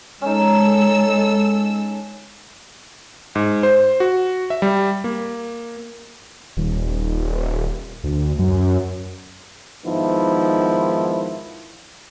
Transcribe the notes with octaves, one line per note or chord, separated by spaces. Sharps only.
G#3 C#4 D#4 A4 E6
G#2
C5
F#4
E5
G3
A#3
D#1
D2
F#2
G#2 D#3 F3 B3 E4